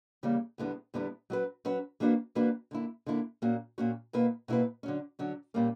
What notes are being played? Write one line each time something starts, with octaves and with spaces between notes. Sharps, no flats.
C#3 E3 G3 A#3
E2 D3 G3 B3 E4
E2 D3 G3 B3 E4
F#3 C#4 F#4 B4
F#3 C#4 F#4 B4
E3 A#3 D4 F#4 B4
E3 A#3 D4 F#4 B4
D3 A#3 E4
D3 A#3 E4
A#2 A#3 C#4 F#4
A#2 A#3 C#4 F#4
B2 A#3 E4 B4
B2 A#3 E4 B4
D3 F#3 C#4
D3 F#3 C#4
A#2 G3 A#3 C#4